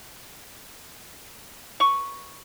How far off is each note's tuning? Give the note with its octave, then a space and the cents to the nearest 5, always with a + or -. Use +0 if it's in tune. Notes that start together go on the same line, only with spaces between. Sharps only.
B4 -10 C#6 +0